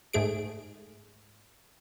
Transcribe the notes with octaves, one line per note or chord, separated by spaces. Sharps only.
G#2 A3 G#4 D7